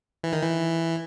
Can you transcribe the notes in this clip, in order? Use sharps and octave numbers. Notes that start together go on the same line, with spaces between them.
E3
D#3
E3